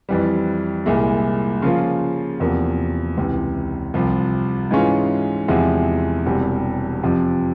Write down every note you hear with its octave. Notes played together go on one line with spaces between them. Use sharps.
F2 E3 G3
C2 A#2 G#3 E4
C#3 F3 A#3 F4
E2 C3 F3 A#3
C#2 C3 E3
C2 C3 F3
G#2 E3 G#3 C#4 F4
E2 C3 F3 G#3 E4
E1 E2 C3 G3
F2 C3 F3